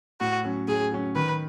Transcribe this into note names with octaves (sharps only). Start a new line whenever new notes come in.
A2 F#4
F#3 C#4
A2 G#4
F#3 C#4
D#3 B4